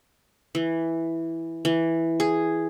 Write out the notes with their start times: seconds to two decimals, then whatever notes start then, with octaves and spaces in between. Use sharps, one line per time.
0.55 E3
1.65 E3
2.20 G#4